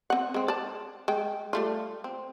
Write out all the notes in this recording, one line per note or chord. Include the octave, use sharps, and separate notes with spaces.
C4 F#5
G#3 C4
D5 A5
G#3 G5
G3 A3 F4
C4